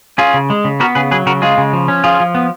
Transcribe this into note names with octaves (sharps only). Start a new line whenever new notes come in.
C#4 F4 G#4
C#3
G#3
C#3
B3 F#4 A#4
C#3 G#4 B4
F#3 G#4 B4
C#3 F#4 A#4
G#3 F4 G#4
C#3
F3
C#4
F3 F4 G#4
F3
B3